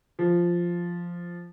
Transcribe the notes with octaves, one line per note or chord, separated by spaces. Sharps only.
F3